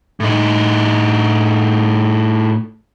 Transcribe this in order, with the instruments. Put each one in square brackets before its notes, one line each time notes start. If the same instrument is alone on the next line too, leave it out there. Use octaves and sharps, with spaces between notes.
[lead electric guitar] A2 D#4